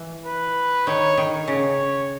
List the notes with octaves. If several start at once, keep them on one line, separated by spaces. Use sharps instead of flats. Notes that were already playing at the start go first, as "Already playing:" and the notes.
Already playing: E3
B4
D#3 C#5
D#3
C#3 C#5